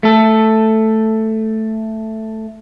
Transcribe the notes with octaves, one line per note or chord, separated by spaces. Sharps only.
A3 A4